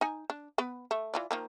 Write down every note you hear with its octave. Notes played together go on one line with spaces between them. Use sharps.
D#4 G#5
D4
B3 B4
A3
E3 F4 D5
D#3 F3 A#3